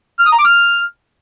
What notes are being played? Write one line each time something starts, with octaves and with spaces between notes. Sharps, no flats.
F6
D#6
A#5
D6
F6